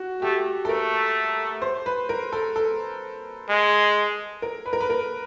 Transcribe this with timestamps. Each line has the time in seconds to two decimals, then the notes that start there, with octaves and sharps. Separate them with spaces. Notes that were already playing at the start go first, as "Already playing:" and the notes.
Already playing: F#4
0.22 A3 G4
0.65 A4
0.69 A3 A#4
1.62 C5
1.86 B4
2.09 A#4
2.33 A4
2.56 A4
3.49 G#3
4.42 A#4
4.66 B4
4.73 A#4
4.81 B4
4.90 A#4